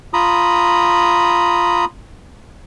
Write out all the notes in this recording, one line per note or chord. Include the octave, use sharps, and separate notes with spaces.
F4 A#5 B5 D#6